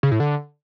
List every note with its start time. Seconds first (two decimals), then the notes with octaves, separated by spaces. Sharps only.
0.03 C#3
0.11 A2
0.20 D3